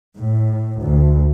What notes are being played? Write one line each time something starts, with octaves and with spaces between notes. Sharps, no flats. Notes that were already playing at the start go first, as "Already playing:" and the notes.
A2
D2